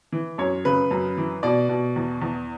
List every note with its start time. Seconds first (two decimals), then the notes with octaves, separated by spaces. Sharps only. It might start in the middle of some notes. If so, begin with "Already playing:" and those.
0.12 E3
0.38 F#2 C#5
0.65 C#3 B4
0.91 F#2
1.17 E3
1.43 B2 D5
1.69 B2
1.96 E2
2.22 E2